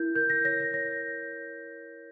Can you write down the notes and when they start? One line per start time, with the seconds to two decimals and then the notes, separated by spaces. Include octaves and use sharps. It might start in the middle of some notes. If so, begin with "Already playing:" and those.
Already playing: E4 A#4 G6
0.15 A#4 G6
0.30 A#6
0.44 C#5 A#6
0.60 A#6
0.73 C#5 A#6